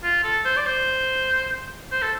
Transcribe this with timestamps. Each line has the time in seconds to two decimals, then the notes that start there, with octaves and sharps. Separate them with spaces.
0.03 F4
0.23 A4
0.45 C5
0.57 D5
0.66 C5
1.92 C5
2.02 A4